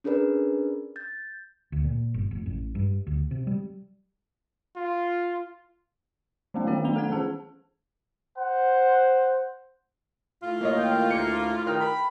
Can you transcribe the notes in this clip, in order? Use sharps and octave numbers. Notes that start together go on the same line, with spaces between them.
C#4 D4 G#4 A#4 B4 D5
G6 A6
D2
A#2
G1
F1
A1
G2
D2
C3
G3
F4
E3 F#3 A3 B3 C#4
D#3 E3 B3 F#4 C#5 G5
F#3 A3 B3 D4 F7 G7
A4 F#5 G#6
E3 C#4 G#4 A5
C5 F#5
A2 F4
A#3 C#5 D#5
D#2 D#3 G5
D2 A#3 C#7
D#3 D#4 G5 F6
B5